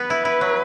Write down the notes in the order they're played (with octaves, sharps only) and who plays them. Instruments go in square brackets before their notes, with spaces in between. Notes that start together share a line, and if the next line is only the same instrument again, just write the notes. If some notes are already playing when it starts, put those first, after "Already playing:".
Already playing: [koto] B3 [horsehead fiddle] B4
[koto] E4
E4
F#3